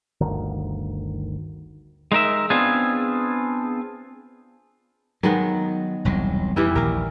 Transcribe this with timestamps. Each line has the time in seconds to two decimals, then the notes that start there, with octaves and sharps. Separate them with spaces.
0.21 G1 D2 D#3
2.12 G#3 D#4 A#4 E5
2.50 B3 C4 D4 F4 G#4
5.23 D#3 F#3 G#3 B3
6.05 E1 C2 F#3
6.56 F2 E3 G3 E4
6.75 A#1 D#2 A#4